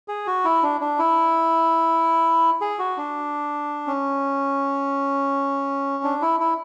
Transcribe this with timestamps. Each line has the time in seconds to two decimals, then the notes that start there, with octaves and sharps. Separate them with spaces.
0.08 G#4
0.27 F#4
0.45 E4
0.63 D4
0.81 D4
0.99 E4
2.61 G#4
2.79 F#4
2.97 D4
3.87 C#4
6.04 D4
6.22 E4
6.40 E4